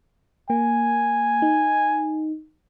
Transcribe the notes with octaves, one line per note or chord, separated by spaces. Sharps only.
A#3 G#5
D#4